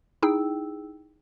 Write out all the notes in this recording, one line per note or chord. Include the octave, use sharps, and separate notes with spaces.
D#4 E4 G#4 G5 E6